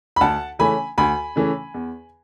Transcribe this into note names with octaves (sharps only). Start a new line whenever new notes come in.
B5
D2 F#5 A5
C#3 E3 A3 C#4 G#5 B5
D2 G#5 B5
C#3 E3 A3 C#4
E2